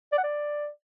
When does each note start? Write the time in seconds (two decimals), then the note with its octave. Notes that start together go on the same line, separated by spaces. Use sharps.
0.12 D5
0.18 F#5
0.23 D5